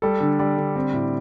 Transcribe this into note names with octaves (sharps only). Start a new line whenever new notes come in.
G3 A4
D3
G3 D5
D3
C4
A2